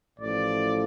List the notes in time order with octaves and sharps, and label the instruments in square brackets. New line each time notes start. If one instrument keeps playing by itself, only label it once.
[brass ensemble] A1 A2 F3 D5